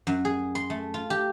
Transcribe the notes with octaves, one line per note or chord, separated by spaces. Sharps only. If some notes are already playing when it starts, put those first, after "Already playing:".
F#2
G#4
C6
A3
F4
G4